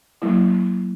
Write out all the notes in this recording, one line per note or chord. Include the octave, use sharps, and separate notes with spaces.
F#3 A#3 E4